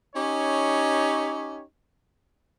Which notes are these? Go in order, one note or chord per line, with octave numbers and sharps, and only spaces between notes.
C#4 D#4 G4 C#5